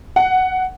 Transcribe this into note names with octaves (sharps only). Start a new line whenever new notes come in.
F#5